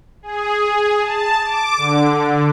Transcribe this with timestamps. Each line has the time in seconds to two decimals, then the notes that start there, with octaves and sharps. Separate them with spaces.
0.23 G#4
1.00 A5
1.44 D6
1.77 D3